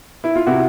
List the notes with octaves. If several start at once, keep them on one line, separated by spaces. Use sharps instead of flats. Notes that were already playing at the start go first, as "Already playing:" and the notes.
E4
F4
C3 E4 F#4